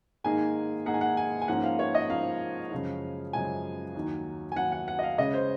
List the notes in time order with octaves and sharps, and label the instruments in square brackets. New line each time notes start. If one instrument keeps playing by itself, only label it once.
[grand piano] G#2 D#3 A#3 D#4 G#4 [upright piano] G#5
[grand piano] G#2 D#3 A#3 D#4 G#4 [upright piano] F#5
[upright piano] G#5
F#5
G#5
G#5
[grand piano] G#2 F3 A#3 C#4 [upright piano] F#5
[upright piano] F5
C#5
D#5
[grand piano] G#2 F3 A#3 C#4 [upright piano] F5
[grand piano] F#2 C#3 F3 G#3
[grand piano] F#2 C#3 F3 G#3 [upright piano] G#5
[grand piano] D#2 D#3 F#3
[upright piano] G#5
[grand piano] D#2 D#3 F#3 [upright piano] F#5
[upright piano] F#5
F#5
D#5
F5
[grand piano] C#3 G#3 C#4 [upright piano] D#5
[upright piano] C5